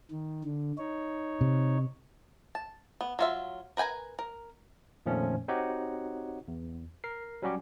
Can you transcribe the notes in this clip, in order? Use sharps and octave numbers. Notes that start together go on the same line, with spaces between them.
D#3
D3
D#4 C#5
C3
A5
B3
F#3 F4 E5
A#4 B4 G5 G#5 A#5
A#4
F2 A#2 D#3 F3 A3 C#4
C4 D#4 F#4 G4 C#5 F#5
E2
A#4 C7
F#3 G3 C#4 F#4 G4